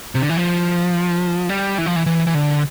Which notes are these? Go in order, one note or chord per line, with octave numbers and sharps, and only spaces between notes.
C3
D3
E3
F3
G3
E3
F3
E3
E3
E3
D3